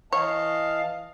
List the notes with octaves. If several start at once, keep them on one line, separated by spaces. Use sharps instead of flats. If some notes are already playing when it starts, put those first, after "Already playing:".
E3 C#5 D#5 F5 A5